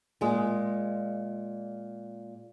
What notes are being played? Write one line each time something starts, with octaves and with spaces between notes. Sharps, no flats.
A#2 G#3